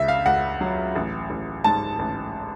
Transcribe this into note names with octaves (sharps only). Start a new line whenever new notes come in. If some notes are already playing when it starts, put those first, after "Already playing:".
Already playing: C#2 C#3 E5
F5
C#2 F#5
F#3
A1
A1
G#2 A5
A1